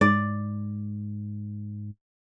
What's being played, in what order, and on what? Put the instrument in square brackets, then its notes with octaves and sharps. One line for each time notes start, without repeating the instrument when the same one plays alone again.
[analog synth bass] G#2 [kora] D5